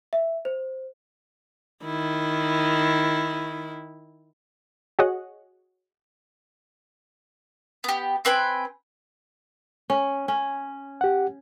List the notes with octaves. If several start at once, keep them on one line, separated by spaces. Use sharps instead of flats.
E5
C5
D#3 E4
F#4 G#4 C#5 D#5 F#5
B3 G4
C4 B4 G5 G#5
C#4
C#4
G4 F#5